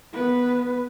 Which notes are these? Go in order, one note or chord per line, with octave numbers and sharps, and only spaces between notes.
B3 B4